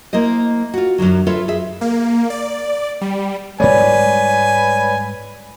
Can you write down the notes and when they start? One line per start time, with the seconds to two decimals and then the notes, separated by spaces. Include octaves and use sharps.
0.13 A#3 E4 C5 D#5
0.74 F4 F#4
0.98 F#2 A2 D3 F#3
1.27 F4 A4 B4 C#5 E5
1.48 G#4 E5
1.81 A#3
2.30 D5
3.01 G3
3.60 G#2 G3 G#3 B4 C#5 D5 G#5